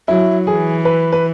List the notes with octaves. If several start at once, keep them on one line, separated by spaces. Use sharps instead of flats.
F#3 E4
E3 G#4
B4
B4